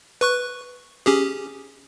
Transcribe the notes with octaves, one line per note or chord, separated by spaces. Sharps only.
B4 C#6 F#6
C#4 G4 G#4